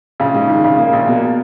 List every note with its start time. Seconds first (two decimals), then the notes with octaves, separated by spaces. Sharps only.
0.20 A#1 C#3
0.34 G#2
0.49 D#3
0.64 A#1 C#3
0.78 A#3
0.93 A#1
1.08 B2 A#3